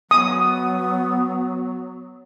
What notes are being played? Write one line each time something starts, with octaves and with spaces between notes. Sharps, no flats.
F#3 B3 D#6